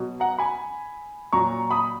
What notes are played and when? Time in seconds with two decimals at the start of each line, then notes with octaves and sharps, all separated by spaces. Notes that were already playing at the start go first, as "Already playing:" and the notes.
Already playing: B2 F#3
0.20 F#5 A#5
0.39 G#5 B5
1.33 A#2 F#3 A#5 C#6
1.71 B5 D#6